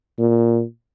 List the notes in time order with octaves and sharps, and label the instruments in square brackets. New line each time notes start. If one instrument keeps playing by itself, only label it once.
[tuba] A#2